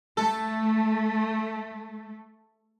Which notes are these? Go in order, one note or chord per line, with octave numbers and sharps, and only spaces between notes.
A3 A4